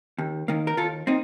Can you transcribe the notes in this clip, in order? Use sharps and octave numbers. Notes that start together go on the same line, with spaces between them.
D#2
D#3 A#3
A#4
D#2 F4 A4
A#3 C4 D#4